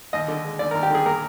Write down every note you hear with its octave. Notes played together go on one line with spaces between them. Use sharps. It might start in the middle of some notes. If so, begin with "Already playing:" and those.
D#2 D#5
D3
G#3
D#2 D5
D#2 A#4
G4
D3 G#4
A#2 A#4